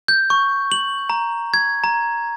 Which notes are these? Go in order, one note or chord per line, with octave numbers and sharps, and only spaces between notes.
G6
C#6
F#7
A#5
G#6
A#5